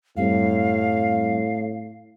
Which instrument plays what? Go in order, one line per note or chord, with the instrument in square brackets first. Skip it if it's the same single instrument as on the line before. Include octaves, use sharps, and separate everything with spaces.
[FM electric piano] F#2 G3 C4 [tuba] A2 [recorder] F5